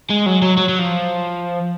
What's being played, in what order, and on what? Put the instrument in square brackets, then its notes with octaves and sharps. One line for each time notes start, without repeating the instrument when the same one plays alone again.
[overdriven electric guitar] G#3
F#3
F#3
F#3
F#3
F3